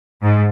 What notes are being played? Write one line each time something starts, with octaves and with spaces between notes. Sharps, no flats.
G#2